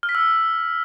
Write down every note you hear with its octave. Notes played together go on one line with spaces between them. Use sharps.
F6
B6
E6